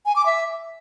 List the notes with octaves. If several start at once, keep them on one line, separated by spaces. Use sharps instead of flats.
G#5
D6
E5